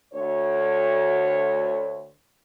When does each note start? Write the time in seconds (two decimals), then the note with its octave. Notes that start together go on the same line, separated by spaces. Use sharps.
0.14 D2 C#5